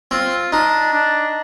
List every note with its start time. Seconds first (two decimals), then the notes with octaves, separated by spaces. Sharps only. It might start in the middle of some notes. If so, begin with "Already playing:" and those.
0.11 C4 F4
0.52 D4 D#4
0.93 D4